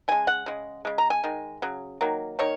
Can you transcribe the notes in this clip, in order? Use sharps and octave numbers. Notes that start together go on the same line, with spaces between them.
C#3 G#3 G#5
F#5
C#3 G#3
C#3 G#3
A#5
G#5
D#3 G#3
C#3 F#3
D#3 F#3 A#3
D#3 A#3 C#5